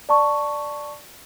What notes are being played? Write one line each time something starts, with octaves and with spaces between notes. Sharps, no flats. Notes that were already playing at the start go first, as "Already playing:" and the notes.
D5 A5 C#6